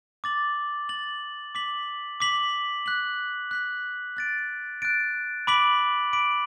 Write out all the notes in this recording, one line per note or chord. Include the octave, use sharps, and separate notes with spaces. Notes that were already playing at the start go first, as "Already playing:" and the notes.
D6 A6 F#7
D6 A6 F#7
D6 B6 F#7
D6 B6 F#7
F#6 B6 F#7
F#6 B6 F#7
F#6 A6 D7
F#6 A6 D7
B5 D6 B6 D7 F#7
B5 D6 B6 D7 F#7